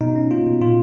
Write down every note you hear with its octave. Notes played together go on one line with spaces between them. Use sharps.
B2 D#4
C#4
A#3 F4
B2
A#2 F4